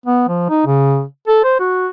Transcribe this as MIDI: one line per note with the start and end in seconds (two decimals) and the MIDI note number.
0.06 0.24 59
0.29 0.49 53
0.50 0.63 63
0.66 1.04 49
1.28 1.42 69
1.44 1.58 72
1.60 1.89 66